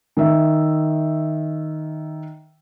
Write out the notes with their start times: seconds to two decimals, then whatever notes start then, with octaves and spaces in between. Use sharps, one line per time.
0.17 D#3 E5